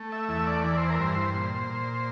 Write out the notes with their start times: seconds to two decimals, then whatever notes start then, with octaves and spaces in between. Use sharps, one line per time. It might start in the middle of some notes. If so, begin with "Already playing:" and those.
Already playing: A3
0.12 E5
0.29 E2 E5
0.47 D5
0.64 E3 D5
0.77 C5
0.90 A#4
0.99 G2 C5
1.34 A#2
1.70 A#2